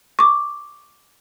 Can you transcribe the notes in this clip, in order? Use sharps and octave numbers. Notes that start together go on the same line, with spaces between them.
C#6 D6